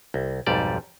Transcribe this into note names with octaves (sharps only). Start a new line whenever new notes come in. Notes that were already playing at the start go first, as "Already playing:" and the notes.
C2
B1 F2 G#2 G3 D5